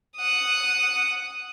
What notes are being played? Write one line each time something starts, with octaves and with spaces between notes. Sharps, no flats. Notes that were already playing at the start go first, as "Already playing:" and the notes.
F#5 D#6